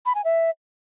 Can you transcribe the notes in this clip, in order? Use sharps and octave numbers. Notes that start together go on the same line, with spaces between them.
B5
G#5
E5